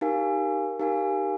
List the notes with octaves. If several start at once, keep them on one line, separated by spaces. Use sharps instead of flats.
D#4 G4 A#4 F5 G#5
D#4 G4 A#4 F5 G#5